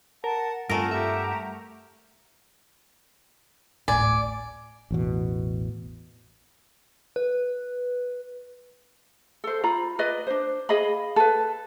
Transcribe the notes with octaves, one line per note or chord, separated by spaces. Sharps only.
A#4 F#5 A5
G2 A3 C4 F4 A#4 F#5 G#5
G4 E5 F#5 A#5
D1 G#1 A2 D5 G#5
A1 E2 B2
B4
A4 C5
F4 A#5 B5
B4 D5 D#5
D4 C5
G#4 D#5 F5 B5
A4 B4